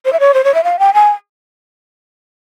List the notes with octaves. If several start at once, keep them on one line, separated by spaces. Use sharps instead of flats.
C5
E5
C#5
C5
C#5
E5
F5
G5
G#5